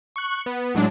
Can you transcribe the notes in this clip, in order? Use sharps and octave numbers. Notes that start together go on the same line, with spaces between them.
C#6 F#6
B3
A2 F#3 G#3 D4